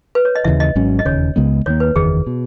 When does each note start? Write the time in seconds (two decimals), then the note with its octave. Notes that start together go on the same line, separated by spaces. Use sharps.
0.15 B4
0.25 C#5
0.35 D#5
0.45 D#2 C#3 E3 E5
0.60 D#5
0.75 G#1 G#2 F#3 C#4
0.99 D#5
1.05 E1 D#2 C#3 C#5
1.36 C#2 C#3 G#3 B3
1.66 D#2 D#3 A#3 C#5
1.80 B4
1.96 F#1 E2 D#3 G#4
2.27 B2